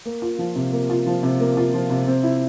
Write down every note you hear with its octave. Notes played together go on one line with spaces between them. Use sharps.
A#3
F4
F3
C3
A#3
F4
F3
C3
A#3
F4
F3
C3
C4
E4